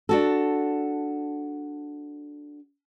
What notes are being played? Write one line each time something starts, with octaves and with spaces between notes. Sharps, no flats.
D4 F#4 A4